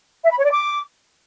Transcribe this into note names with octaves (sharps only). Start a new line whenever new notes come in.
E5
B5
C#5
D5
D6